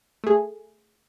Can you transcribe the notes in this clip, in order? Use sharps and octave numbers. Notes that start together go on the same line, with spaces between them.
A3 G#4